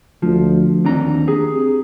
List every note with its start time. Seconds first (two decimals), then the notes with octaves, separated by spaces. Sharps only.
0.22 D2 F3
0.85 D#2 C4 D4 A#5
1.27 G4 G#4